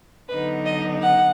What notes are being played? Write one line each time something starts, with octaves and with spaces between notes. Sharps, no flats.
D3 F#3 B3 D#4 B4
D#5
F#5